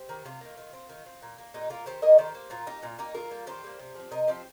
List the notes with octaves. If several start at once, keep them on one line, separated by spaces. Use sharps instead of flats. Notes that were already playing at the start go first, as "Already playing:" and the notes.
Already playing: G4 C5
D#3 A#3
C3 F4
D#3 A#3
D#3
C4
D#3
C4
A#2
A#3
A#2 D#4 G4
A#3 F4 A#4
D#3 G4 C5
A#3 A#4 D#5
D#3 G4 C5
A#3
A#2 F4 A#4
A#3 D#4 G4
A#2 F4
A#3 D#4 G4
D#3 F4 A#4
G3 A#3
D#3 G4 C5
G3 A#3
C3
F3 C4
C3 A#4 D#5
F3 C4 G4 C5